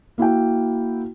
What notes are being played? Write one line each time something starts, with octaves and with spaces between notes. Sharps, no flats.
A#3 E4 F#4 G5